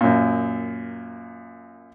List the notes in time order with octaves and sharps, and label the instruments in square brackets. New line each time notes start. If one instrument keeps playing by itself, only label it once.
[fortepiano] F#2 A#2